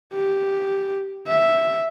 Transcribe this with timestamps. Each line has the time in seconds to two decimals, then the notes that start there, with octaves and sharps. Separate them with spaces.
0.13 G4
1.28 E5